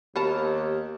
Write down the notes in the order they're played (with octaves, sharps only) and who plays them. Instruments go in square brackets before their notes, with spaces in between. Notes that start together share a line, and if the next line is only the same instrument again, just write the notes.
[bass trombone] D#2 [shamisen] B3 A#4 A5 [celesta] G4